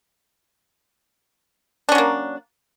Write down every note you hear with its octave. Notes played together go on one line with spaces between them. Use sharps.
F#3 A#3 C#4 D4